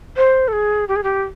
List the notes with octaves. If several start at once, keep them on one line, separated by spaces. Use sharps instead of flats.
C5
A4
G#4
G4
G#4
G4